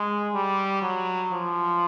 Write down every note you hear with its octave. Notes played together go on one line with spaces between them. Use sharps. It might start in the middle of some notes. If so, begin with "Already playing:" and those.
Already playing: G#3
G3
F#3
F3